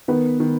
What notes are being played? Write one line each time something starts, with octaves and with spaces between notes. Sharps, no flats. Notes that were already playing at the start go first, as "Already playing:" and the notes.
D#3 B3 B4
D#3